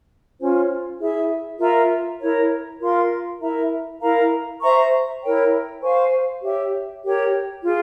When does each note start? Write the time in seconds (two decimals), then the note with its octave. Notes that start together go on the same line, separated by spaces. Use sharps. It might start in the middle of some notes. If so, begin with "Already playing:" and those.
0.40 C#4 F4 C5
1.00 E4 G#4 E5
1.60 F4 A#4 E5 A#5
2.20 E4 A#4 C#5
2.81 F4 A#4 F5 C6
3.41 E4 A#4 E5 A#5
4.01 E4 A#4 F5 A#5
4.62 C5 E5 A#5 C#6
5.22 E4 A#4 C#5 G5
5.83 C5 F5 G#5 C#6
6.43 G4 C#5 E5
7.04 G4 A#4 C#5
7.64 F4 G#4